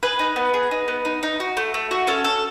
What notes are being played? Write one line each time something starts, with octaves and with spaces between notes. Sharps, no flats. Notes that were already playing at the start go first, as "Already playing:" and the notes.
G#4 B4
D#4
B3
G#4
D#4
B3
D#4
D#4
F#4
A3
A3
F#4
C#4 A4
A4